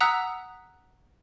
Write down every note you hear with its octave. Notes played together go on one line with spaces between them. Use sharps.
F#5 A#5 D#6 E6 F#6 B6